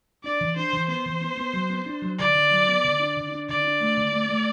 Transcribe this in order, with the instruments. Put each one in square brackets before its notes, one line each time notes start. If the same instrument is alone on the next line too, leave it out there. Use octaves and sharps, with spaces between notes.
[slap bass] D4 [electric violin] D5
[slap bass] E3
[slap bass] D4 [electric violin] C5
[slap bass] E3
[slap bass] B3 [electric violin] C5
[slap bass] E3
B3
B3
F#3
B3
D4
F#3
[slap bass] D3 [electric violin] D5
[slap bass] D3
F#3
B3
D3
D4
D3
D4
[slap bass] D3 [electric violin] D5
[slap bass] D4
A3
D3
A3
A3